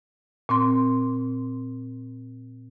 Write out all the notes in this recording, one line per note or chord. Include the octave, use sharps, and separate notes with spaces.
A#2 C4 C6